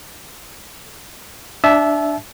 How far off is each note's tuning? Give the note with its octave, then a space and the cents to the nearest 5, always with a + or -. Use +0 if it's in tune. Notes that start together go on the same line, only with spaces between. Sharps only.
D4 +0 E5 +0 A5 -35